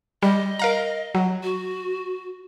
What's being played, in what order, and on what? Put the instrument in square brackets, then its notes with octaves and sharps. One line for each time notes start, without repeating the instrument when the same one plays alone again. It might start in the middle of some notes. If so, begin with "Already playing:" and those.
[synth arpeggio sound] G3 [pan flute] D#5
[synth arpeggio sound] A#4 F5 A#5
F#3
[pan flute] F#4